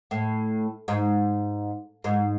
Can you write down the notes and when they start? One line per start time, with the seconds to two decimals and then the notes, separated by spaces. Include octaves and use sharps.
0.11 A2
0.88 G#2
2.04 G#2